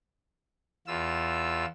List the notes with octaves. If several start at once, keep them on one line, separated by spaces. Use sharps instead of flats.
E2 F4 E6